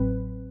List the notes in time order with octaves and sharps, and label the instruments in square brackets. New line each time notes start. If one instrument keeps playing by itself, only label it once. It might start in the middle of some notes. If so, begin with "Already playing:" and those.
Already playing: [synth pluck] A1 A2 F#3 C4 B4